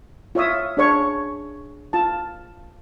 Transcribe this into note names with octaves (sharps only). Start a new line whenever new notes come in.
F4 C#5 E5 D#6
D4 G#4 C#5 C#6
F4 A5